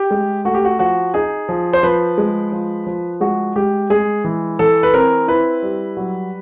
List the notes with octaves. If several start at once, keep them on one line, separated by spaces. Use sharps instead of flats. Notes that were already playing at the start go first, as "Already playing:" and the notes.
Already playing: G4
G#3
A3 F#4
G4
F#4
F3 F#4
D#4 G#4
F3
C5
F3 B4
G#3
F3
F3
G#3 F#4
G#3 G4
G#3 G#4
E3
E3 A4
B4
C4 A#4
E4 B4
G3
F#3